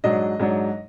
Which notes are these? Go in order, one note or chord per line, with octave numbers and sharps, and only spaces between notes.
G#2 F#3 D4 D#5
G#2 F#3 D4